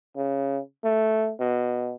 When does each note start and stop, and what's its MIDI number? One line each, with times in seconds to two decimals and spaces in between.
0.16 0.59 49
0.84 1.32 57
1.40 1.96 47